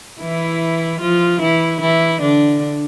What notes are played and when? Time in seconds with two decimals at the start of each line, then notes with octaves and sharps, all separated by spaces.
0.22 E3 E4
1.01 F3 F4
1.41 E3 E4
1.81 E3 E4
2.21 D3 D4